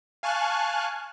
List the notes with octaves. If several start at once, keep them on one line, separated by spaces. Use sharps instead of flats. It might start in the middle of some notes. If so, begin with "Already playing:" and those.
F5 G#5 A5 C#6 F6 F#6